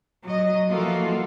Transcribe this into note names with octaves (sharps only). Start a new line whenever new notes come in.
F#3 D#5
E3 F3 A#3 F4 F#4 A4